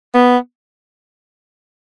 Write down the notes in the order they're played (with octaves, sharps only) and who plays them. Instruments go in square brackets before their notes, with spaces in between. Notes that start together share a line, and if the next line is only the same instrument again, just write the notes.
[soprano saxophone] B3